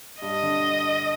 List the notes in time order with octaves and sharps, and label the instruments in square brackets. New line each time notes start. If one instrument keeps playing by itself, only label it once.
[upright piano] G2 [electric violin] D#5
[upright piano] D3